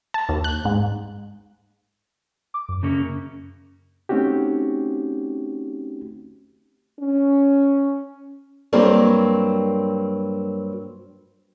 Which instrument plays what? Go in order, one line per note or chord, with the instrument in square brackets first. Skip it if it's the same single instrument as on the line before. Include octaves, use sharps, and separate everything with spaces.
[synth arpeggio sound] A5
D#2
F#6
G#2
[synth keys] D6
F#2
[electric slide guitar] C#3 A#3 C#4
[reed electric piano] A3 C4 C#4 D#4 F#4 G4
[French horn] C#4
[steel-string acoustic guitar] G2 F#3 A#3 C4